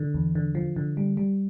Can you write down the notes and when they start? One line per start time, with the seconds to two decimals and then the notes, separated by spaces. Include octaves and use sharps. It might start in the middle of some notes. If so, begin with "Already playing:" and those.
Already playing: D3
0.14 E2
0.35 D3
0.55 F3
0.76 D3
0.97 G3
1.17 G3